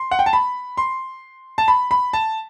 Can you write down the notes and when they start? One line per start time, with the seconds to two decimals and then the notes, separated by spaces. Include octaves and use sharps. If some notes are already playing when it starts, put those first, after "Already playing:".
Already playing: C6
0.11 F#5
0.19 G5
0.26 A5
0.33 B5
0.77 C6
1.58 A5
1.68 B5
1.91 B5
2.13 A5